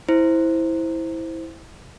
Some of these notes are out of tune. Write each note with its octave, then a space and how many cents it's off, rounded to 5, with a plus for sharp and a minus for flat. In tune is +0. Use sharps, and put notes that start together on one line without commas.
E4 -10 C5 +0